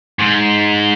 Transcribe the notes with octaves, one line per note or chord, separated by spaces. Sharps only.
G#2